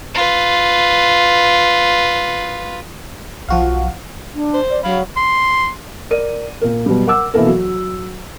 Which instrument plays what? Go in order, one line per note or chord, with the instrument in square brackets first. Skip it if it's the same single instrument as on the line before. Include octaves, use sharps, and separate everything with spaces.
[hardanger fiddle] F4 B4
[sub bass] B1 [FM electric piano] F3 F#4 F5
[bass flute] D4
[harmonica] C5
[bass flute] D5
[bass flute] F#3 [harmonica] F5 B5
[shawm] C6
[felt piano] A#4 D5 D#7
A#2 A#4
B2 F#3 G3
A#4 F#5 D6 E6
B2 E3 A#3 A4 A#4
F#3